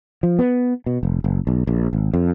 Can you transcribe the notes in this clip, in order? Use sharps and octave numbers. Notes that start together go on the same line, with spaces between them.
F3
B3
B2
F1
F#1
B1
A#1
G#1
F2